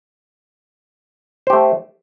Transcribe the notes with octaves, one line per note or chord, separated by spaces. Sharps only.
A3 G4 C5